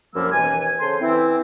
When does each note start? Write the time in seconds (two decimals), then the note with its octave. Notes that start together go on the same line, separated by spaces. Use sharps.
0.15 C2 F#2 F3 G3 A#3 E6
0.32 D#2 B2 E3 G#5
0.80 C#3 A4 C5 C6
1.00 E3 C4 E4